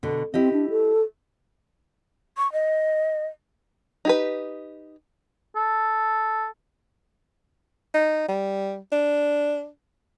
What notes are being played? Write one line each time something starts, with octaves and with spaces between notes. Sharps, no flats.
B2 D3
C4 E4 G4 D#5
D4
A4
C#6
D#5
D#4 G4 B4
A4
D#4
G3
D4